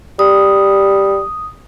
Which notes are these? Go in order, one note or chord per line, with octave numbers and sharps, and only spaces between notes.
G3 D#6